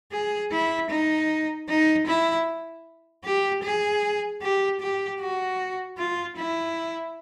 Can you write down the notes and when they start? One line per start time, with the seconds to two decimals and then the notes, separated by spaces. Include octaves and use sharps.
0.12 G#4
0.51 E4
0.90 D#4
1.68 D#4
2.07 E4
3.24 G4
3.63 G#4
4.41 G4
4.80 G4
5.20 F#4
5.98 F4
6.37 E4